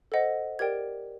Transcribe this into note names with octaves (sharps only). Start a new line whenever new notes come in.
A4 C5 D#5 F#5
G4 A#4 D5 G5 G#6